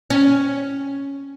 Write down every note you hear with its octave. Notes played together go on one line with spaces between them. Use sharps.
C#4